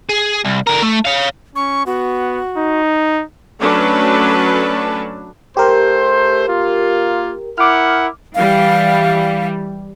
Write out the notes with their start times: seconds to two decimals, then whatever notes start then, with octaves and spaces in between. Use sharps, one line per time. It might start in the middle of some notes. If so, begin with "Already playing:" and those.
0.09 G#4
0.45 C2
0.67 D3 A#4
0.83 A3
1.05 C#5 F5
1.55 C#4 C#6
1.86 B3 F#4
2.58 D#4
3.58 F#3 A3 C#4 D4 B4 A5
5.57 A3 G4 A#4 C5
6.48 A#3 F4
7.58 E4 A#4 F#5 D6 F6
8.35 E3 G3 F5